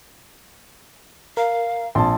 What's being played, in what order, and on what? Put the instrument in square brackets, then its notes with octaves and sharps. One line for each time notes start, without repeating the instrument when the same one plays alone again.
[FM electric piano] A#4 [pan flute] F5
[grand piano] A#1 [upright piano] A5 C6